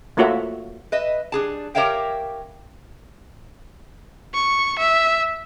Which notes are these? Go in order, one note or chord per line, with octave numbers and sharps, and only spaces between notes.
A3 A#3 F4 F#4 C#5 E5
B4 D#5 E5
G3 D4 G#4 A5
G4 A#4 C#5 E5 F5 G5
C#6
E5